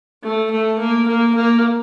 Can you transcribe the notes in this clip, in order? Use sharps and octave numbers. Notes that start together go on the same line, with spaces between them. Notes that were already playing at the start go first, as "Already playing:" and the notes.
A3
A3
A#3
A#3
A#3